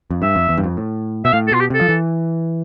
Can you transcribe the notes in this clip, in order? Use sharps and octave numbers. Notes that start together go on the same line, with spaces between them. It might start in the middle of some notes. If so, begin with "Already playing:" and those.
F2
G2 E5
F2
E2
G2
F2
A2
B2 E5
A2 F5
A4
B2 F4
G4
C3 A4
F3
E3